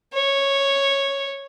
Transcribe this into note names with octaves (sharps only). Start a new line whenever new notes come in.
C#5